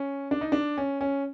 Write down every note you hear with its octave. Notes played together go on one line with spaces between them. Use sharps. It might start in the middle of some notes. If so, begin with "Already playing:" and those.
Already playing: C#4
D4
D#4
D4
C#4
C#4